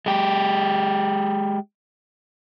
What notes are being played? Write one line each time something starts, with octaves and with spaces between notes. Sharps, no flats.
G#3 G4